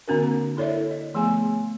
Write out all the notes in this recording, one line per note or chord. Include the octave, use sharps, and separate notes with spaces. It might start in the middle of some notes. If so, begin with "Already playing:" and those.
D3 A#3 C4 D4 F#4 A#4
E4 A4 C#5 D5 E5
D#5
F3 A3 B3 G#4 G#5